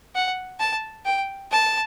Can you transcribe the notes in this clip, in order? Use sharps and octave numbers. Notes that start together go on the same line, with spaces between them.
F#5
A5
G5
A5